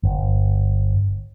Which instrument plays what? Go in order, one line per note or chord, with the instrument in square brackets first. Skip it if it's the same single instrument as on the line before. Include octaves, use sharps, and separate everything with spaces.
[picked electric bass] G1